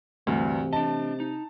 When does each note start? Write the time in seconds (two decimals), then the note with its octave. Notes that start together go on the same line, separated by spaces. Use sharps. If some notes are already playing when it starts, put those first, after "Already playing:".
0.27 D2 G2 C3 E3 A3
0.73 D4 D#5 A5
1.20 D#4